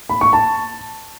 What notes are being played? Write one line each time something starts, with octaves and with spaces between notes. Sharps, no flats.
B5
C#6
A5